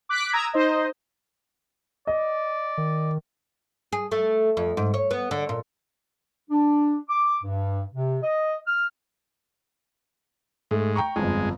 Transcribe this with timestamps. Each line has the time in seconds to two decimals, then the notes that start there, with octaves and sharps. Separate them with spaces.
0.09 D6 F#6 B6 D7
0.32 A#5 D#6 E6 G#6 A#6
0.54 D#4 C5 D#5
2.07 D5 D#5
2.78 D#3
3.92 G#4
4.11 A3
4.57 F2
4.77 G#2
4.94 C#5
5.11 B3
5.31 D3
5.49 A#2
6.50 D4
7.09 D6
7.43 G2
7.94 C3
8.23 D#5
8.67 F6
10.71 G#2 A3
10.96 G5 A#5 C#6
11.16 G1 F2 G#3